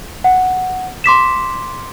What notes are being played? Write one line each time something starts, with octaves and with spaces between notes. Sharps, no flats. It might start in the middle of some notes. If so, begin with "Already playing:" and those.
F#5
C6 D6 B6 E7